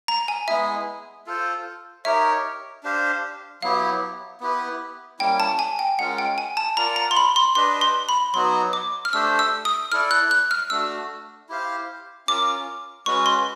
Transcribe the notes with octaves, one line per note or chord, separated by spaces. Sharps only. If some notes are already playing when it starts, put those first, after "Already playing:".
A#5
G#5
G#3 B3 E4 G#4 E5
F4 A4 C5
D#4 G4 A#4 C#5 E5
D4 G4 C5 F5
F#3 B3 E4 G4 F5
B3 E4 G4 B4
G3 A#3 C#4 E4 G5
A5
G#5
G5
G#3 C#4 F4 A#4 F#5
G5
G#5
A5
F4 A#4 D5 F#5 A#5
A#5
C6
B5
C6
D4 G4 B4 D#5 C6
C6
B5
F#3 B3 D#4 F#4 C6
D6
F6
A3 D4 G4 C5 E6
E6
D#6
E4 A4 D5 F6
F#6
F#6
F6
A3 D4 F#4 E6
E4 G4 C5 F5
C#4 F4 A#4 D6
G#3 C#4 F#4 B4 C#6
C6